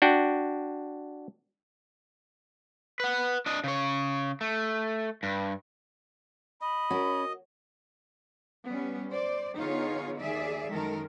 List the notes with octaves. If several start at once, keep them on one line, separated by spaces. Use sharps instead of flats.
D4 F#4 G5
B4 F#5
D4 D#5
C#3 C#5
A3
G2
D#5 B5
C#4 F#4 A#4
G3 B3 C#4
C5 D5
D3 B3 D#4 F4 G#4 C#5
D#2 G#4 D5 E5
F#2 D#3 G#3 A4 A#4